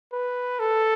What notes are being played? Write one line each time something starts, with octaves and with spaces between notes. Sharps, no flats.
B4
A4